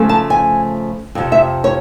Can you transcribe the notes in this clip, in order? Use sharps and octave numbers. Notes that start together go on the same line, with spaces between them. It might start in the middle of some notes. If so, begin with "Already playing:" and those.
Already playing: C#3 F3 A3
A5
G#5
F2 C3 F3
E5
C#5